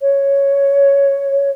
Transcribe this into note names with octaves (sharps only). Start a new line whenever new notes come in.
C#5